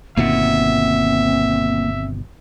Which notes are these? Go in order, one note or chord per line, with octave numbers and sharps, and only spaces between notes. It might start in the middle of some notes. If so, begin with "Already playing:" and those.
G1 B2 D#3 A#3 C4 F4 E5 F#5